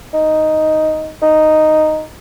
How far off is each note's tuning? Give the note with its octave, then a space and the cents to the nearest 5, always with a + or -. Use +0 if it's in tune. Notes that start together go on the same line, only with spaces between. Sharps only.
D#4 +0
D#4 -5